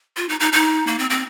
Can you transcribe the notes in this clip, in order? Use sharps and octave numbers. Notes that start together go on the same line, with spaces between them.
F4
D#4
D#4
D#4
A#3
C4
C4